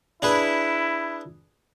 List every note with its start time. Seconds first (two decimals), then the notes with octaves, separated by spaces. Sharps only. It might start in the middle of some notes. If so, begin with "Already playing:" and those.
0.22 D4 E4 G#4 B4